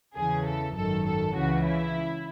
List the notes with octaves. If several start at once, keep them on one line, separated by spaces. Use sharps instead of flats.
E2 C#3 E3 G#4
A4
G#1 F#2 D#3 A4
A4
C#2 C#3 E3 F#4
E4